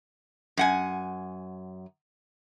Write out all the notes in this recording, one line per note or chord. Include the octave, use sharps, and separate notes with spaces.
F#2 F#5 G#5